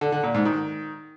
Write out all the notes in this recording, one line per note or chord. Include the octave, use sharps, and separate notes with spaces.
D3
D3
A#2
G#2
D#3